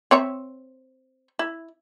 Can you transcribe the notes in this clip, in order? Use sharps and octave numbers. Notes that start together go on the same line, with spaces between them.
C4 C#5 E5
E4